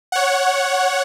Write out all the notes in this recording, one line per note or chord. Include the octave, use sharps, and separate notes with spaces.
C#5 F#5